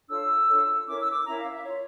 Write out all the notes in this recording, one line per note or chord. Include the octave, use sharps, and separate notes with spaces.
D4 F4 A4 C#5 E6
D4 F4 A4 C#5
C#4 E4 A#4 C#5 D6
E6
D6
C#4 E4 A#4 C#5 A#5
F5
E5
F4 C#5